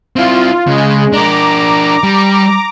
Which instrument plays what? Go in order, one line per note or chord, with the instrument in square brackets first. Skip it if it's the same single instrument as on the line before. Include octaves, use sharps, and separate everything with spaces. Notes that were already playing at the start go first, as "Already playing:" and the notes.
[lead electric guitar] C4 E4 [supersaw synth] F4
[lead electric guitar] C#3 [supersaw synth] G#3
[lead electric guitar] D4 A#4 [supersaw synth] A#5 D6
[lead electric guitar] G3